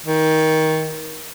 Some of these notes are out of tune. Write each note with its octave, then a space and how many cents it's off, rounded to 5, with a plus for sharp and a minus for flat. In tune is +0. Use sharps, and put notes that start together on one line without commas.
D#3 +20